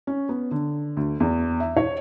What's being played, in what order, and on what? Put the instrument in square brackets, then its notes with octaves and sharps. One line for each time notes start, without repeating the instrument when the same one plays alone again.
[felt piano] C#4
B3
D3
D2
E2
E5
C#5